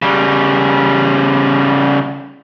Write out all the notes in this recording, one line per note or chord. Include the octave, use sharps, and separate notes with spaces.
C#3 G3